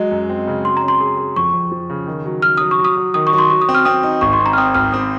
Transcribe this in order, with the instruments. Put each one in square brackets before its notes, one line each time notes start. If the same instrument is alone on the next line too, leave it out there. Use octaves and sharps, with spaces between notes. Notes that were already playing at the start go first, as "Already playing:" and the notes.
Already playing: [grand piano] F#3 G#3 [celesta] D#5
[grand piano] F#2
C4
C#3
[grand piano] F#3 [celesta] C6
[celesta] A#5
[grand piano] C#4
[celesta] C6
[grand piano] G#4
G#4
[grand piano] F2 [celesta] C#6
[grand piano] F2
F3
C#3
D#3
F#3
[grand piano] F#3 [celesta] F6
[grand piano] F#3 [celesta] D#6
[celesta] C#6
[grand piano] F#3
[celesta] D#6
[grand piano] F#3
[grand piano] D#3 [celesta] D#6
[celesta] C#6
[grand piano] F#3
[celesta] C6
[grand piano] F#3 [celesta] C#6
[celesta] D#6
[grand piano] C4
[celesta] F6
[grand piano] C4 [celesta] D#6
[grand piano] D#4
[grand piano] G#1 [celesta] C#6
[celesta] C6
[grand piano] C4
[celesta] A#5
F6
[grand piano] C4 [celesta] D#6
[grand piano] G#1 [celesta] F6
[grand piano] C4 [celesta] D#6